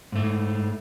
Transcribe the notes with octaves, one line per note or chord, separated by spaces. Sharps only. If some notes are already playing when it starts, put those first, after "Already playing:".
G#2 A3